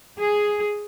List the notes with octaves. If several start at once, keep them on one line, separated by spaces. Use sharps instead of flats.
G#4